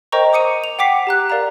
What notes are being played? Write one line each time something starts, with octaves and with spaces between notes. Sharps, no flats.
A#4 C5 D#5 G5 A#5 C#6
D6 D#6 C#7 D#7
F7
F#5 G5 D6 B6 C7
G4 A#5 F#6
A#4 D5 F5 A#5